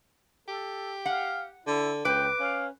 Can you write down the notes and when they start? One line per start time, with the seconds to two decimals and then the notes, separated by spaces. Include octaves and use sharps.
0.48 G4 A4
1.06 F5 F#5
1.66 D3 E4
2.05 C#2 B4 G5 D6
2.40 C#4 F5